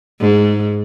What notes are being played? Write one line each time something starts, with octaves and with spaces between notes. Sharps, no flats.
G#2